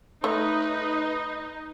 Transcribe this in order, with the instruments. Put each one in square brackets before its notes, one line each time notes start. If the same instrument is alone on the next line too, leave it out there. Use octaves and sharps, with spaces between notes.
[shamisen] A3 C#5 [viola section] D#4 [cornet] B4